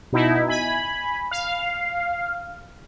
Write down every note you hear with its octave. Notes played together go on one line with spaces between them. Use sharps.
B2 D#4 E4
G#5 B5
F5